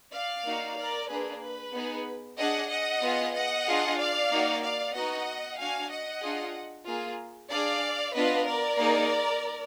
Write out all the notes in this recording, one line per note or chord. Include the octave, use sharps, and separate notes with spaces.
D5 F5
A#3 D#4 F#4
A#4 D5
A#3 D4 G#4 B4
B4
B3 D#4 G#4
D4 G#4 D#5 F#5
D#5 F#5
B3 F4 G#4
D#5 F#5
D4 F4 G#4
D5 F5
A#3 D#4 F#4
D5 F5
B3 D#4 F#4 D#5 F#5
D4 F#4 F5 G#5
D#5 F#5
D4 F4 G#4
A#3 F4 G#4
D4 G#4 D5 F5
B3 D4 F4 B4 D#5
A#4 D5
A#3 D#4 G#4